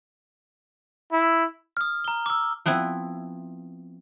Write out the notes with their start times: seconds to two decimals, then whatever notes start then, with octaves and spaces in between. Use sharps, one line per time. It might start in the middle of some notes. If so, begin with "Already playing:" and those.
1.12 E4
1.77 D#6 F6
2.04 A#5 G7
2.26 D6 E6
2.66 F3 B3 C4 E4